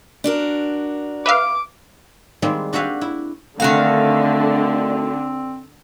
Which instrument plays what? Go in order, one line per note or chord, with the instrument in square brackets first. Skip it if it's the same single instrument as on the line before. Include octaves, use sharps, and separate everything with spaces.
[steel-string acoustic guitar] D4 F#4 A#4
[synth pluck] B4 E5 F5 [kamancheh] D6
[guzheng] D#3 G3 G#3 A#3 C4
D4 F#4 G4 E5 F5 G#5
E4
[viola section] D3 [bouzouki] D#3 F#4 F5 [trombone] A3 [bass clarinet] C4